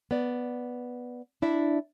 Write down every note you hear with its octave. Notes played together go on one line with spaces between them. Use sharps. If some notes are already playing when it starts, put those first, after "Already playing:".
B3 D5
D4 E4 D5 E5